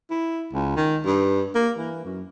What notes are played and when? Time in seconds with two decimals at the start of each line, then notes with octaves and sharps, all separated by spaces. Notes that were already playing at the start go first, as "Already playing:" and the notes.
0.10 E4
0.53 C#2
0.76 D#3
1.06 G2
1.55 A#3
1.78 E3
2.05 F#2